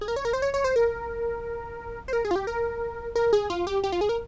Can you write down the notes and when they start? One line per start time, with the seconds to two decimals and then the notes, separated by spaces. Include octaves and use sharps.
0.01 G#4
0.08 A#4
0.16 C#5
0.25 A#4
0.33 C5
0.42 C#5
0.54 C#5
0.64 C5
0.76 A#4
2.08 C5
2.13 A#4
2.25 G#4
2.31 F4
2.36 G4
2.47 A#4
3.15 A#4
3.33 G#4
3.50 F4
3.67 G4
3.84 G4
3.92 F4
4.01 G#4
4.09 A#4